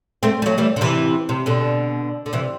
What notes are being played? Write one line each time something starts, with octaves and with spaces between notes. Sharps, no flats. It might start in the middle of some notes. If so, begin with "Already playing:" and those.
A3 C4
G3
F#3 A3
E3 G3
D3
C3 E3
C3
B2 D3
D3
C3 E3